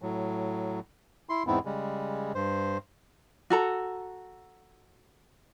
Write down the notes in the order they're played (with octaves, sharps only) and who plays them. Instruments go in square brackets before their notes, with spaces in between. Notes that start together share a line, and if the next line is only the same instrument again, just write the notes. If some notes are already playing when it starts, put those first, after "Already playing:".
[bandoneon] A2 F#3
E4 C6
E2 G#2 B3 C4 E4
C#3 G3 G#3
G2 C5
[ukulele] F#4 A4 A#5